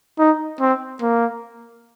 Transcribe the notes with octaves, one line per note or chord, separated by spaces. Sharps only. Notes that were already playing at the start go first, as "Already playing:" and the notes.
D#4
C4
A#3